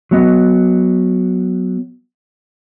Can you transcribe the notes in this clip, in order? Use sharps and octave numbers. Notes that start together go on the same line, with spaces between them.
F#3 B3 D#5